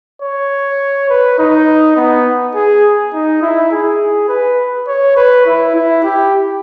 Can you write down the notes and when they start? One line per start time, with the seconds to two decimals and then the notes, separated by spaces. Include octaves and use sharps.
0.22 C#5
1.10 B4
1.38 D#4
1.97 B3
2.55 G#4
3.13 D#4
3.42 E4
3.72 G#4
4.29 B4
4.87 C#5
5.17 B4
5.46 E4
5.75 E4
6.04 G4